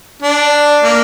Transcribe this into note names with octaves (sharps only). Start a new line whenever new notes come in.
D4
A#3